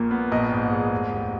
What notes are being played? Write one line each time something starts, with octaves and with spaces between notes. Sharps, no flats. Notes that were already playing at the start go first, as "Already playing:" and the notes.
Already playing: A#1 A#2 A#3
B3
A#1 D#5
G#2
G#3
F1
D#2